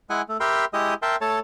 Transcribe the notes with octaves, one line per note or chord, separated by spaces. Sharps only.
G#3 E4 F#5 G#5
A3
G4 A#4 E5 G5 B5 C6
G#3 E4 G4 D#5 D#6
A#4 E5 G5 A5 C6
A3 A4 C#5 A5